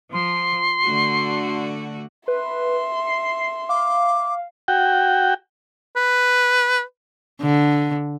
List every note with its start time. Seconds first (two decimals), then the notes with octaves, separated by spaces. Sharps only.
0.13 F3 C6
0.83 D3 A3 F#4
2.28 B4 E5 C6
3.07 C7
3.69 F5 D6
4.68 F#4 G5
5.96 B4
7.41 D3